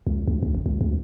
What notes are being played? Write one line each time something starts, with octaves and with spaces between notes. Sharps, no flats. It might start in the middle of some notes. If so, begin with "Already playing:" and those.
C#2
D2
D2
G1
C#2
D2